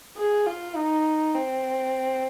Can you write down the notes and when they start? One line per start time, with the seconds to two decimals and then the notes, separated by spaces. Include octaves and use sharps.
0.17 G#4
0.46 F4
0.76 D#4
1.35 C4